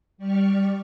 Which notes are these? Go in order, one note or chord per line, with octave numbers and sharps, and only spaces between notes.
G3 G4 D5 C#6 F6